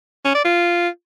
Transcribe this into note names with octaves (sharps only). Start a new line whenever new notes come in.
C#4
D5
F4